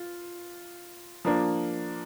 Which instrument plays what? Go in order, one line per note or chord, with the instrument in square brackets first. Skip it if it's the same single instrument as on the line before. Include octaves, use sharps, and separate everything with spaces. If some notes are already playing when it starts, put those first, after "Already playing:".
Already playing: [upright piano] F4
F3 A#3 D4